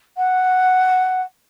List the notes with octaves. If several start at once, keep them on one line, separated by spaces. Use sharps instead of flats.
F#5